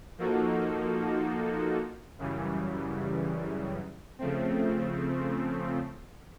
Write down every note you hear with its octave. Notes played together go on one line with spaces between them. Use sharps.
F3 A#3 D#4 F#4 A4
F#2 C#3 E3 G3
C#3 F3 A3 C4